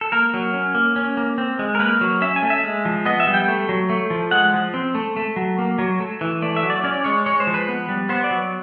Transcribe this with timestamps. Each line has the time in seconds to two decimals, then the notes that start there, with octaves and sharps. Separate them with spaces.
0.01 A4
0.12 A#3 A#4
0.34 F#3
0.54 C#4
0.75 A#3
0.96 C#4
1.17 A#3
1.38 C4
1.59 G#3
1.75 A#4
1.79 A#3 B4
2.01 F#3
2.21 C#4 E5
2.36 G#5
2.42 A3
2.50 E5
2.64 G#3
2.85 F3
3.05 B3 D#5
3.20 E5
3.27 G3
3.34 G5
3.48 A3
3.69 F#3
3.90 A3
4.10 F3
4.31 G#3 F#5
4.54 F3
4.74 C4
4.95 A3
5.16 A3
5.36 F#3
5.59 A#3
5.79 F#3
6.00 A3
6.21 E3
6.42 A3 D5
6.56 E5
6.63 F#3
6.70 D5
6.84 C#4 D5
7.04 G#3 C#5
7.26 G#3 C#5
7.40 C5
7.47 F3
7.54 B4
7.68 B3
7.89 G3
8.09 B3 C5
8.24 D5
8.31 F#3